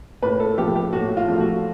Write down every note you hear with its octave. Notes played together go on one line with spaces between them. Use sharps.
A2 B4
A4
F3 A3 G4
G4
A2 F#4
F4
F3 A3
F#4